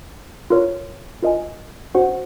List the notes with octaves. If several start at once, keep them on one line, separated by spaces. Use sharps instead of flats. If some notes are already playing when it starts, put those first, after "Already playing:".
F4 A#4 C#5
F4 A#4 D#5 G#5
C#4 F#4 C5 F#5